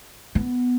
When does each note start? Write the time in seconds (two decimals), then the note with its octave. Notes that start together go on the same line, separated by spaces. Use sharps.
0.35 B3